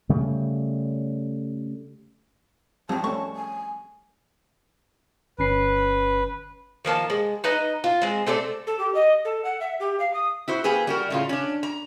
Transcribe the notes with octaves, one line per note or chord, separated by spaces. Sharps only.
C#3 G3 A3
D#3 F3 G3 A3 C4 A5
A3 C#4 C#6
G#5
G1 C#4 B4 C7
D#3 F3 A#3 A5
G#3
D#4 B4 D#5 A#5
F4
G#3 C4
A3 C4 A4 D5
A4
G4
D#5
A4
F#5
E5
G4
F5
D#6
E4 F#4 C5
A#3 G4 G#4 B4
G3 F#4 A#4
A2 C#3 F4
C#4 D4
A#5